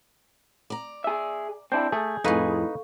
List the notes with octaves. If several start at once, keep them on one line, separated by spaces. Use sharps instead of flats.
D5 A#5
G#4 E5
C4 D4 E4 G6
A3 G#4
F2 A2 D#4 A4 B4 F5 C#6